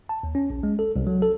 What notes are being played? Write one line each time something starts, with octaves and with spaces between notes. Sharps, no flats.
A5
D#2
C#4
A#1
G#3
A4
C2
F#3
A4